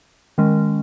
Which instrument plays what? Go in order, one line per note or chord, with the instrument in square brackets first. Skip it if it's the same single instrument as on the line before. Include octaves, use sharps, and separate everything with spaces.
[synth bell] D#3 G#3 C#4